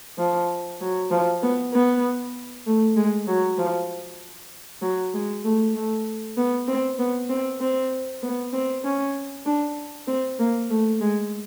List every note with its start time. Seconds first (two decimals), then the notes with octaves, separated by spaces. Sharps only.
0.19 F3
0.81 F#3
1.11 F3
1.43 B3
1.73 B3
2.67 A3
2.96 G#3
3.27 F#3
3.58 F3
4.82 F#3
5.14 G#3
5.44 A3
5.75 A3
6.38 B3
6.68 C4
6.99 B3
7.29 C4
7.60 C4
8.23 B3
8.53 C4
8.84 C#4
9.46 D4
10.07 C4
10.39 A#3
10.70 A3
11.01 G#3